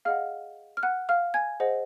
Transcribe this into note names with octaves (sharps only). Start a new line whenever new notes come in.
G#4 D#5 F5 F#5 F6
F6
F#5 F#6
F5 F6
G#5 G#6
G#4 C5 D#5 F#5